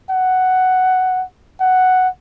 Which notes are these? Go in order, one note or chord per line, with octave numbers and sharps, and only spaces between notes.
F#5
F#5